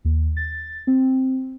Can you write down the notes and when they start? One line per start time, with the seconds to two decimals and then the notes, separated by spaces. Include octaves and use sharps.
0.05 D#2
0.37 A6
0.87 C4